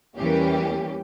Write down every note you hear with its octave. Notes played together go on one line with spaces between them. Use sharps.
E2 E3 G3 A#3 C#4 G4